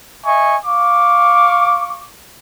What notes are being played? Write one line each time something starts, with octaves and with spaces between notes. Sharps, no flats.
D#5 E5 G#5 C#6
F5 C#6 D6